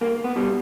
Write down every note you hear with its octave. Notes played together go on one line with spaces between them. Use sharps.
C#2 A#3
B3
B2 G3